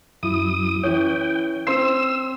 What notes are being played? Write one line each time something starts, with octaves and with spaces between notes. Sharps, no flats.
F#2 E4 D#6
E3 C#4 G5
C4 C6 E6 C7